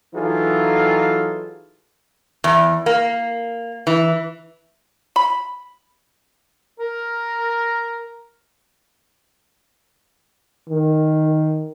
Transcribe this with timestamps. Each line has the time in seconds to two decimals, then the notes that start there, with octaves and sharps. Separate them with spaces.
0.15 E3 F#3 D#4 F4 G#4 A4
2.44 E2
2.86 A#3
3.87 E3
5.16 B5
6.79 A#4
10.70 D#3